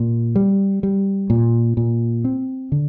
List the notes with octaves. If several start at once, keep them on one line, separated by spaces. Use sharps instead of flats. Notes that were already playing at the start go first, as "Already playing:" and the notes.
Already playing: A#2
G3
G3
A#2
A#2
C4
D3